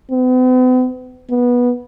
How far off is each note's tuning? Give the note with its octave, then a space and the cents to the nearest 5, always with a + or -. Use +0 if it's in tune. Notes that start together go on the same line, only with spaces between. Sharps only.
B3 +45
B3 -15